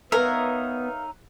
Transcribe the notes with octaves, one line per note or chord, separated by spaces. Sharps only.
B3 D#4 A#4 B4 C#5 E5 F5